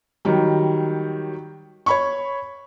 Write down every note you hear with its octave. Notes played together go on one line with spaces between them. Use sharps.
D#3 F#3 G3
C#5 B5 C#6